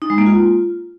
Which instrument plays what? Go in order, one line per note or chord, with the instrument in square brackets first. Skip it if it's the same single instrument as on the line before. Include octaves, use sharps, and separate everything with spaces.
[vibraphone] D#4
G#3
A#3
F4